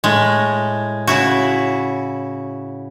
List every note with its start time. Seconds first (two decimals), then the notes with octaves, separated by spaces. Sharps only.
0.04 A2 G#3
1.07 C#3 E4 F#4